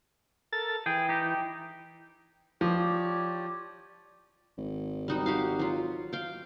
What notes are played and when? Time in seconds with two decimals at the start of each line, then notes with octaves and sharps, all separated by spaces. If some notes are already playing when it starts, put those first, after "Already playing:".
0.53 A4 A#4 A6
0.86 E3 G#4 G5
1.09 D#4 G4
2.61 F3 G4 C#5 D5
4.57 G#1
5.08 G3 D#4 F#4
5.26 F#4 G4 F5
5.59 F#3 F4
6.13 F5 G5